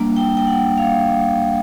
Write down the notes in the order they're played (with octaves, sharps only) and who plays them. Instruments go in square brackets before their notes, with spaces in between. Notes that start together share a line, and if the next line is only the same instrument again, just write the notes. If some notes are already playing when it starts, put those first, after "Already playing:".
Already playing: [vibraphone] G3 A#3 D4
G5
G5
F#5
F5